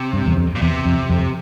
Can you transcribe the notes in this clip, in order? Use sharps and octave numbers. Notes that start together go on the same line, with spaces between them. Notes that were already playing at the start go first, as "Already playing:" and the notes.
Already playing: C3
G2
E2
F2
A#2
E2 C3
F2
F2